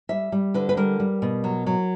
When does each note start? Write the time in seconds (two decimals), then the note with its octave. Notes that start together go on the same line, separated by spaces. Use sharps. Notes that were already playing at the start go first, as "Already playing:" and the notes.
0.09 G3 E5
0.32 G3
0.54 D3 B4
0.69 B4
0.77 G3 A#4
1.00 G3
1.22 B2
1.44 F#3
1.66 F#3